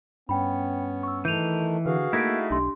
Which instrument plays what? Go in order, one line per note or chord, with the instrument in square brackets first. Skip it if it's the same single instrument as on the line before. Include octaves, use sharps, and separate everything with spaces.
[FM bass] G2 [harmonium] B3 C#4 [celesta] G5 B5
[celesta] C#6 E6
[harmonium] D#3 A3 [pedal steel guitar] E3 [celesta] G6 D#7 F7
[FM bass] D3 [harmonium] F#4 G#4 F5 [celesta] B4
[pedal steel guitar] A3 D#4 E4 [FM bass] A#3 [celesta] G#6 B6 D7
[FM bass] B1 [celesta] D4 G4 C6